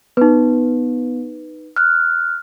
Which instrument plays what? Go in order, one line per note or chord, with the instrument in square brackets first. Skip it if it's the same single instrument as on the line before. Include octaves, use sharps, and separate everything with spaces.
[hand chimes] B3 [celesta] D#4 B4
[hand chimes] F6 F#6